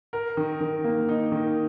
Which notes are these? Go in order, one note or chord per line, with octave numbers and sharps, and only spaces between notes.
A#4
D#3
D#3
A#3
D#4
D#3